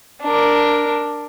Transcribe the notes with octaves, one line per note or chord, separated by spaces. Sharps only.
D4 A#4